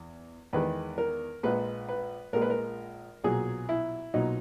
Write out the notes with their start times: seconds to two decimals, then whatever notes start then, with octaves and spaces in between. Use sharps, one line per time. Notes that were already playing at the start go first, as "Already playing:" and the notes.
Already playing: E2
0.53 E2 D#3 G#3 B4
0.98 A#4
1.43 A#1 A#2 G#3 B4
1.89 B4
2.33 A#1 A#2 G#3 A#4
2.42 B4
2.50 A#4
3.24 B1 A#2 F#3 G#4
3.69 E4
4.14 B1 A#2 F#3 D#4